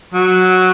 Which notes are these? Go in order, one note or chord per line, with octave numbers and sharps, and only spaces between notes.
F#3